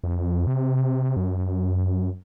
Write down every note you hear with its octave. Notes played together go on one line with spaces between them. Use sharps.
F2
C3
F#2